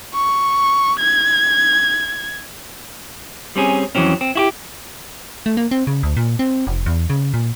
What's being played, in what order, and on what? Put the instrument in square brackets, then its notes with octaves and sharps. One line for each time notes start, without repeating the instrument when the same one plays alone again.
[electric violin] C#6
G#6
[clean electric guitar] G3 C4 C#4 G#4
F2 E3 F#3 C4 C#4
C4
E4 F#4 G4
[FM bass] A3
A#3
C4
C#3
D2
A#2
C4
F1
E2
C#3
A#2